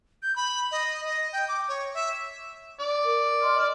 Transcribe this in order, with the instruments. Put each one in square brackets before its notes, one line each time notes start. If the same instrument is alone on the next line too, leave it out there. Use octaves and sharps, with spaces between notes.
[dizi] G6
B5
D#5
D#5
G5
D6
C#5
E5
[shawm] D5
[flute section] A#4
D#5 C6 F6
[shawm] D5